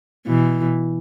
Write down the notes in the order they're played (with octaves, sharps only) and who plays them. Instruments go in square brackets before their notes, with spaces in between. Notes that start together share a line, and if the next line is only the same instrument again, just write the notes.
[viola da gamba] B2 E3